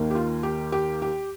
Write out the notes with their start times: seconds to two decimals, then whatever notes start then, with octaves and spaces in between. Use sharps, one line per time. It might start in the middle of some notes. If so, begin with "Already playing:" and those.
Already playing: D#2 D#3 A#3
0.11 G4
0.15 F4
0.43 G4
0.72 G4
1.02 G4